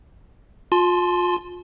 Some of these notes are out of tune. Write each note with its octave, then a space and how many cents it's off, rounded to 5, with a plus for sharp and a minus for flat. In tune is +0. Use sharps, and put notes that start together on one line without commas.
F4 +30 A5 -40 C6 +0